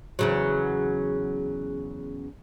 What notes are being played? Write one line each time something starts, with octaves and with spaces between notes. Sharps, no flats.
E2 C#3 F#3